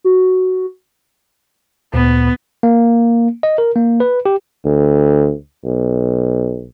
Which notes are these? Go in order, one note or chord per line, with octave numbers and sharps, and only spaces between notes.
F#4
D2 A#2 B3
A#3
D#5
A#4
A#3
B4
G4
D2
B1